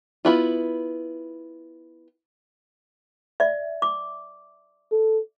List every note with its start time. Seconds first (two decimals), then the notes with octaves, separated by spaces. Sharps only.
0.25 B3 E4 F4
3.40 D5 E5
3.82 D6
4.92 A4